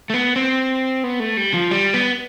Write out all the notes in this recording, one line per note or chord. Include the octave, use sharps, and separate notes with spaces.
A3
B3
C4
B3
A3
G3
F3
G3
B3